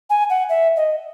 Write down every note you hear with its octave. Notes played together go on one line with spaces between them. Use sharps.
G#5
F#5
E5
D#5